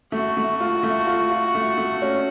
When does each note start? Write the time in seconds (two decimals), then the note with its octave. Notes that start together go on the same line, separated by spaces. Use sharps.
0.12 A3 F#4
0.37 A3
0.60 F4
0.83 A3
1.07 F4
1.31 F4
1.55 A3
1.78 A3
2.02 C#4